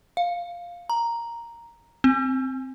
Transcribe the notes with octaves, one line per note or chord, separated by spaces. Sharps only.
F5
A#5
C4